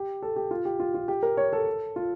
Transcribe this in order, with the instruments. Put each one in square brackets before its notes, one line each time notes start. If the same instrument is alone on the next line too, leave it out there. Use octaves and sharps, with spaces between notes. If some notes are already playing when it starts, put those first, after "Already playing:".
Already playing: [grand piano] G4
A4
G4
F4
G4
F4
F4
G4
A#4
C#5
A4
F4